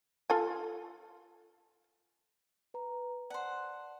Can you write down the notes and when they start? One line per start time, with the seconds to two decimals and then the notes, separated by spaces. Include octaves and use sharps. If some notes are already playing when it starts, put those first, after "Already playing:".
0.30 F4 A4 G#5
2.74 B4 A#5
3.30 C5 D5 F#5 A5